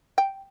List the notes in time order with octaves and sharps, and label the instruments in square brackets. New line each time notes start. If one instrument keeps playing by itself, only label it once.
[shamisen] G5